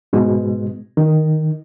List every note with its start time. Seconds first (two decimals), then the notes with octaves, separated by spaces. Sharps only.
0.13 G#2 B2 G#3
0.97 D#3